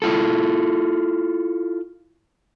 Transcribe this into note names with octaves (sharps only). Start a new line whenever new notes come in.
E4 F4 A4